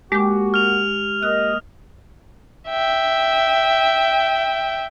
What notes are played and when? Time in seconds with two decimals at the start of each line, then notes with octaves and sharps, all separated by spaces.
0.12 G#3 A#3 F#4 G4 D6
0.54 F6 F7
1.23 A#3 D#5 F#6
2.69 E5 G5